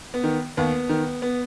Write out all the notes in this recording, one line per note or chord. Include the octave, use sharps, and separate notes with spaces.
B3
D#3
D#2 B3
D#3
B3